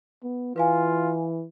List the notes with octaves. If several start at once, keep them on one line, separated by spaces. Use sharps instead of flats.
B3
E3 F4 B4 F5 G#5